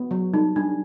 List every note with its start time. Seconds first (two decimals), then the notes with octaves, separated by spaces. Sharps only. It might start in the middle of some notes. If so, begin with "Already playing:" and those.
Already playing: B3
0.11 F#3
0.34 G3 D#4
0.56 G3 D4